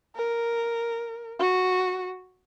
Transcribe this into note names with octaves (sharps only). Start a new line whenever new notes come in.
A#4
F#4